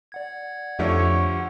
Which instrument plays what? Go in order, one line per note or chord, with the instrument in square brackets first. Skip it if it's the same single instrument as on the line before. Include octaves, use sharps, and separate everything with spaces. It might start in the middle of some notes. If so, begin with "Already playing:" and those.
[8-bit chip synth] D5 F#5 G#6
[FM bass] F2 [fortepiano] D3 F3 A3 [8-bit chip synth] G4 F#5 [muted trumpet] C#5